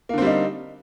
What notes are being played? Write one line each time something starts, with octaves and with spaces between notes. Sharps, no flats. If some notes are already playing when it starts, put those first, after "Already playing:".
D3 G3 A#3 C4 D#4